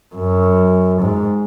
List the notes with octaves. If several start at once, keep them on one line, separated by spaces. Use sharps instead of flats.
F#2
G#2